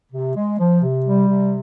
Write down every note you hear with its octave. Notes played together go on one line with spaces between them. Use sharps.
C3
G#3
F3
C3
G3
C3